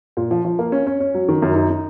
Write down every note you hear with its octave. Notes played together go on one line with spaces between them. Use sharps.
A#2
F3
F3
A#3
C#4
C#4
C#4
F#3
D#3
F#2
D#4
D#4